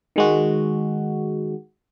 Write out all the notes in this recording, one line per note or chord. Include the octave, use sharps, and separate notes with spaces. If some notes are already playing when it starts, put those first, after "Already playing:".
D#3 G#3 F#4